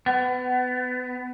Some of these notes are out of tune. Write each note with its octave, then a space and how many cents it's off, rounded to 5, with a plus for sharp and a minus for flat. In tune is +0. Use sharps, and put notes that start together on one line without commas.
B3 +25